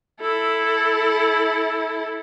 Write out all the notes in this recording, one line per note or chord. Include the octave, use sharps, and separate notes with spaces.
E4 A4